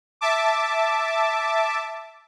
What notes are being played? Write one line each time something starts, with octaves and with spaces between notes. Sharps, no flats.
E5 A5 D6